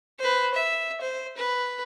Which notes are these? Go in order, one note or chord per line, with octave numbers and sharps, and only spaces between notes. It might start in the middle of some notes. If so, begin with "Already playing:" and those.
B4 C5
E5
C5
B4